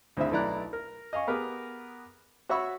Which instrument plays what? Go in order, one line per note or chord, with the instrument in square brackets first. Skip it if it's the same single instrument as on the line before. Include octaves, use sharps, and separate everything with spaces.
[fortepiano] D2 C4 E4 G#4 E5
B1 A3 E4 D5 A#5 F#6
A#4
D#5 F5 G#5 C#6
B3 G4 G#4 A#4 B4
F#4 C#5 E5 B5 C#6 E6